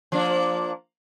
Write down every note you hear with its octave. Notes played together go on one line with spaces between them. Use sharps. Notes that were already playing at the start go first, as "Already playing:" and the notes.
F3 A#3 D4